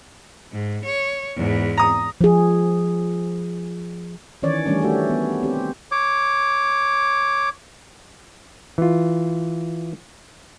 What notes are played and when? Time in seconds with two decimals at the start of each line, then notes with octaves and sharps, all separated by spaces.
0.52 G#2
0.85 C#5
1.36 E2 G#2
1.78 A#5 D#6
2.21 F3 G#4
4.42 D#3 E3 C#4 C#5 D5
4.66 E3 G3 A3 C#4 D4
4.81 A3 F#4 G4 A4
5.10 B3
5.43 C4 G4
5.91 C#5 D6
8.78 E3 F4